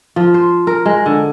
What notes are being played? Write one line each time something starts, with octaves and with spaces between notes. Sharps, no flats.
F3
C5
A#4
G#3
D3